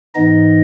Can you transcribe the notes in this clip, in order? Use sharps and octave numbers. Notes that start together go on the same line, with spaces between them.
G#2 E3 B3 D#4 D#5